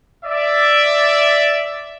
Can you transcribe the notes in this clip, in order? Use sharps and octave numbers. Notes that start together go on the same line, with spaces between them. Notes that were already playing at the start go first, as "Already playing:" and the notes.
D5 E5